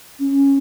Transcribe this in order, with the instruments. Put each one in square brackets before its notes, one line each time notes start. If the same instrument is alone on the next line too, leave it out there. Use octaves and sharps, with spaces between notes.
[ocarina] C#4